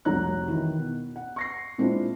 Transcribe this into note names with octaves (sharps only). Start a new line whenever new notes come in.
F1 C2 F#4 C#5 A#5 F#6
D#3 E3
B2
F#5
C#6 A#6 C7
A#2 G#3 C4 D4 E4 F4